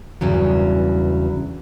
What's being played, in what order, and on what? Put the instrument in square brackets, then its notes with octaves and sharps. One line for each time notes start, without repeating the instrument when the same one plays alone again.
[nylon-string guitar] E2 G2 C#3 F#3